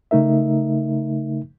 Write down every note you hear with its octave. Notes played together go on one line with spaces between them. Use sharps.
C#3 A3 D#4 A#4 E5